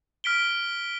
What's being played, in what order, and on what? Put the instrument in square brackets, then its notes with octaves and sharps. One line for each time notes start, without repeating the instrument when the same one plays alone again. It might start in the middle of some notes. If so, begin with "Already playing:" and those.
[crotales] F6 B6 D7 G7